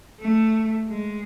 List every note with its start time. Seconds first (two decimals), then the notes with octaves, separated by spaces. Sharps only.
0.20 A3
0.88 G#3